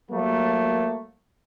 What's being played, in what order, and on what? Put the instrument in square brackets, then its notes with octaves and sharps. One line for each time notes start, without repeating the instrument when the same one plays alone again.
[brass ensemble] F#3 G3 A3 A#3